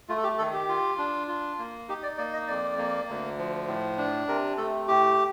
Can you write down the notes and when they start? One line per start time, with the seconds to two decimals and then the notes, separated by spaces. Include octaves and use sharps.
0.09 A3 F4
0.17 A4
0.23 G4
0.38 D#3 A4
0.53 G4
0.69 F4
0.98 D4
1.28 F4
1.59 A#3
1.89 D#4 G4
2.03 D5
2.18 A#3 D5
2.33 D#5
2.48 F2 D5
2.79 A#3
3.08 D2
3.39 F3
3.68 A2
3.98 D4
4.28 C3 A#4
4.57 A3 A4
4.88 A2 G4